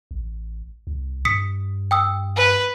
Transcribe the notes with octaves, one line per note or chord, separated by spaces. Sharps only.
A1
C2
G2 D#6 B6 C#7
G5 D#6 E6
B4